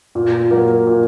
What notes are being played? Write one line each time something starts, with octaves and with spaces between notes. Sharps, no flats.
A#2
F#3 A#3
A#2